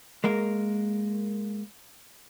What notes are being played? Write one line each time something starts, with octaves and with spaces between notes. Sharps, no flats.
G#3 A#3 A#4